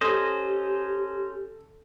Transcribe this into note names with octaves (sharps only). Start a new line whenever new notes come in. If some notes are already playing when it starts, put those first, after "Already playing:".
C#4 G4 A4 C5 D#5